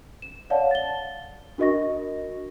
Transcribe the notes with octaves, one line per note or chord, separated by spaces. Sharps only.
E7
C#5 D5 F5 F#5 A5
A6 G7
D4 F#4 A#4 D#5 C#6 A#6